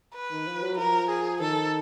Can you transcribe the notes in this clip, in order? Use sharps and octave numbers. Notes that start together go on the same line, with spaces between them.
B4
D#3
F3
F#3
F3 A#4
G#4
D#3 A4